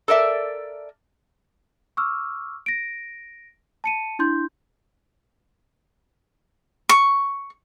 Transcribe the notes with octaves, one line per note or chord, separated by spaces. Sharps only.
A4 A#4 D5 E5
C#6 D6 E6 F6
A#6 D7
A5 C#7 D#7
D4 E4 C6 G6
C#6